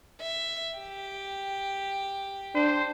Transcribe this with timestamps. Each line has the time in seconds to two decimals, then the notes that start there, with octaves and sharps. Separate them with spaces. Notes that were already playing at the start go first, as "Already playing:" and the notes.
0.20 E5
0.79 G4
2.55 D4 C5